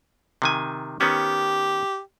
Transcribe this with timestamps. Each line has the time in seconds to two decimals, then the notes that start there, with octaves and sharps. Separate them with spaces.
0.42 C3 D#3 G#5
1.01 D#3 B3 C#4 G4